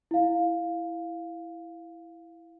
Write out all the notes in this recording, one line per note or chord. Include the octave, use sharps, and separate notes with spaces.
E4 F5